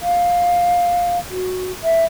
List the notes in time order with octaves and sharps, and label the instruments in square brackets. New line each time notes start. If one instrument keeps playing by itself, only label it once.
[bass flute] F5
F#4
E5